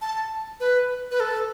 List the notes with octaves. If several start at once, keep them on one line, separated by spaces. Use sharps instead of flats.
A5
B4
B4
A4